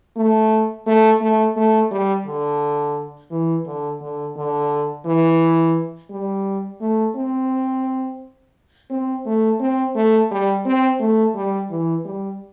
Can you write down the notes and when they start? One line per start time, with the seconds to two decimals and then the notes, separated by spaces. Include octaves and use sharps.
0.16 A3
0.86 A3
1.21 A3
1.56 A3
1.91 G3
2.26 D3
3.31 E3
3.66 D3
4.01 D3
4.36 D3
5.06 E3
6.10 G3
6.81 A3
7.16 C4
8.90 C4
9.26 A3
9.60 C4
9.96 A3
10.31 G3
10.65 C4
11.00 A3
11.35 G3
11.70 E3
12.05 G3